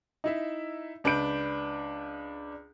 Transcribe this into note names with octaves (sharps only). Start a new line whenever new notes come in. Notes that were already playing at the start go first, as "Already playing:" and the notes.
D#4 E4 E5
C#2 D4 B4 B5 G6 D7